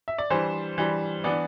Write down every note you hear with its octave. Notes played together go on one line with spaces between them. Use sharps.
E5
D5
E3 G3 D4 C5
E3 G3 D4
E3 B3 D4 D5